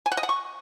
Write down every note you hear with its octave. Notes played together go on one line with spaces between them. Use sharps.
G#5
F#5
D#5
F#5
C#6